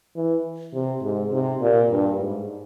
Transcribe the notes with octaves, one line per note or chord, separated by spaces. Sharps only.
E3
C3
G#2
C3
A#2
G2
G#2